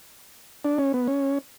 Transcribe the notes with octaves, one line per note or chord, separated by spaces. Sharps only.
D4
C#4
B3
C#4